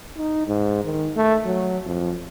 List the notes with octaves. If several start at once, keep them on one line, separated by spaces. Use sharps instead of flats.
D#4
G#2
D#3
A3
F#3
F2